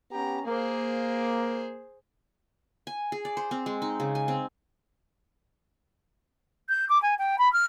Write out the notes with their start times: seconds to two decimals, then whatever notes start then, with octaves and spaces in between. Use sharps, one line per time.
0.12 B3 C#4 G4 A#5
0.46 A#3 G#4 C5
2.87 G#5
3.12 G#4
3.25 D5
3.37 C5
3.51 C4
3.66 G#3
3.82 D#4
4.00 C#3
4.15 G#5
4.28 C4
6.69 G6
6.89 D6
7.02 G#5
7.19 G5
7.39 B5
7.53 F6